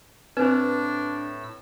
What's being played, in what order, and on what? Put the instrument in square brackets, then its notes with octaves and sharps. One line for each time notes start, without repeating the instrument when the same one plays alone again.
[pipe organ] A2 E6 [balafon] C4 [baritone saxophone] D4 [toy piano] B4 C5